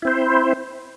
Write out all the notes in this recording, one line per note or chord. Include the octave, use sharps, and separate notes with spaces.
C4 E4 C5